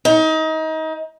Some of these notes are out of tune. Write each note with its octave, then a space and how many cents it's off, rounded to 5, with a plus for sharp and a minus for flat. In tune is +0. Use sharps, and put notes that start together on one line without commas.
D#4 +30